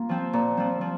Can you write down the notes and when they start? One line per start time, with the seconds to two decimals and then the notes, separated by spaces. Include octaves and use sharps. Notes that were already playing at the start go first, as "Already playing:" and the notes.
Already playing: A#3 F4
0.09 F3 C4
0.33 A#2
0.57 F3 C4
0.81 F3